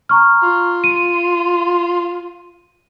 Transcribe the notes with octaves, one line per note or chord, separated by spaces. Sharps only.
A#5 C#6 F6
F4
D#7